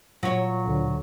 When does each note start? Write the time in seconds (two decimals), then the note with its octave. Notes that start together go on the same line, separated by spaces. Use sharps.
0.23 A#2 F#3 C#5
0.65 D2 D3